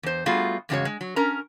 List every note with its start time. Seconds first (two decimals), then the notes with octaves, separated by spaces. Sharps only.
0.03 E2 C5
0.26 G3 A3 B3 F4 F#4 G#4
0.69 E2 G2 C#3 G#3 F#4 C#5
0.85 G#3
1.01 F#3
1.16 C#4 A#4 A#5